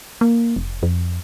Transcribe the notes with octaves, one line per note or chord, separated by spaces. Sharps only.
A#3
F1
F2